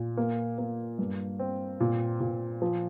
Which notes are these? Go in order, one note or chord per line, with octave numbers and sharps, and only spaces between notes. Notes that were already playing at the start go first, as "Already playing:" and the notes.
Already playing: A#2
A#3
A#3
G2
C4
A#2
A#2
F3